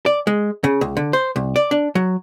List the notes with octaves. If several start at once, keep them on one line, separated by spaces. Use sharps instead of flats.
D5
G#3
C#3
C#2
D3
C5
C2
D5
D4
F#3